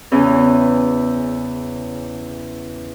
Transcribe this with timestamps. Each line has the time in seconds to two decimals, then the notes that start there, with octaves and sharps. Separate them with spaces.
0.11 E2 C#3 E3 C#4